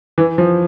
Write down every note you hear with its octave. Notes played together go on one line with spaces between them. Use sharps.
E3
F3